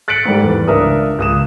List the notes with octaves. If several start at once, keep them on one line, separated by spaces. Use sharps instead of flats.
F#6 A6 B6 C#7 D7 F#7
G#2 G3 A3
E2
C#2 D4 A#4 E5 D#6
C#2 D#6 E7